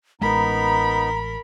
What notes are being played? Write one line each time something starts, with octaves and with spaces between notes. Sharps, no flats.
A1 G#3 B3 D#4 A#4 A#5 B5